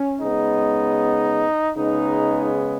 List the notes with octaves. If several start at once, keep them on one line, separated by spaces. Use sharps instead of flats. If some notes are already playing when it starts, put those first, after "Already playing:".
Already playing: C#4
C#3 G#3 B3 D#4
C#3 G#3 B3 D#4